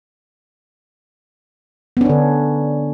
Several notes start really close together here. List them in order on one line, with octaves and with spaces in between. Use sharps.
B3 C#4 D4 D3